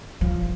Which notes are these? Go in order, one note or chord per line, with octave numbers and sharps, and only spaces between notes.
F3